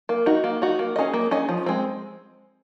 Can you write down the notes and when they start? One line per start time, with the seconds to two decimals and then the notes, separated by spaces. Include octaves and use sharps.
0.09 A#3
0.26 D#4 F#4
0.44 A#3
0.62 D#4 F#4
0.79 A#3
0.96 C#4 G#4 D#5
1.13 A#3
1.31 C#4 G#4 D#5
1.49 F3
1.66 G#3 C4